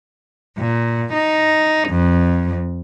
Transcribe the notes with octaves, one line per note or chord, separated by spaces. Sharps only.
A#2
D#4
F2